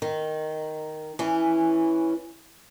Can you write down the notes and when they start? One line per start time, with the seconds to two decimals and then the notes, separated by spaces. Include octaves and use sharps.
0.02 D#3
1.19 E3 C#4